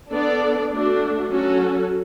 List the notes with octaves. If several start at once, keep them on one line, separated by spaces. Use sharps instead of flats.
B3 D4 A4 D5
A3 D4 F#4
F#3 C#4 F#4 A4